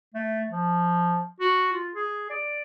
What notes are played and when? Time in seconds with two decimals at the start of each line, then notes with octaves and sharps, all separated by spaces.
0.14 A3
0.49 F3
1.40 F#4
1.73 F4
1.94 G#4
2.30 D5